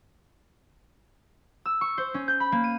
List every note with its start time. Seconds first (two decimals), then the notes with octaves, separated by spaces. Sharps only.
1.66 E6
1.81 C#6
1.98 C5
2.14 C#4
2.28 G6
2.40 B5
2.52 A#3
2.64 D#7